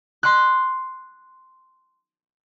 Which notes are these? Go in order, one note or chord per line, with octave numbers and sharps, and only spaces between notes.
C6 F#6